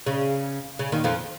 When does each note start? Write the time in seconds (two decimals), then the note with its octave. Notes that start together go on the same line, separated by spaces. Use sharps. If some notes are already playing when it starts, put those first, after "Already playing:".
0.06 C#3
0.79 C#3
0.92 D#2 D#3
1.04 F2 F3